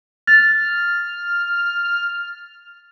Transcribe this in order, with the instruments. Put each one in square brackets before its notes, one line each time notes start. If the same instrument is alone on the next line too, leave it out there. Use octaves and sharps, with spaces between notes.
[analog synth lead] F6 [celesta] A6